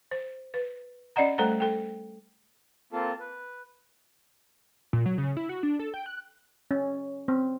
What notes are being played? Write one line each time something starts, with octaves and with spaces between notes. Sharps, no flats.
C5
B4
C#4 D5 D#5 F#5 A#5
G3 A3 A4 C5 F#5 A#5
A4 G5
A#3 C4 F4 A4 A5
B4
A#2
F#3
C#3
E4
F#4
D4
A4
G5
F#6
C#4
C4